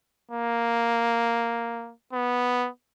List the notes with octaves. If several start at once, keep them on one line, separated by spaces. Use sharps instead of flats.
A#3
B3